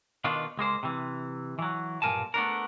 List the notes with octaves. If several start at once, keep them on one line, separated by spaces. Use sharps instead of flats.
B2 D#3 A#3 D4 F4
C#2 G#3 A#3 C5
C3 E3
E3 F#3
B1 G2 A#2 A#4 G#5 A5
A3 B3 D4 A#4